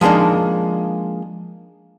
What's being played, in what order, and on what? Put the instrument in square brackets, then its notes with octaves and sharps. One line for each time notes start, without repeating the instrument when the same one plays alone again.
[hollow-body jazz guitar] F3 G#3 A#3 D4 D#4